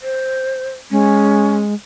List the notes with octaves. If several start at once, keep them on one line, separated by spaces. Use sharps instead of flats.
C5
G#3 C#4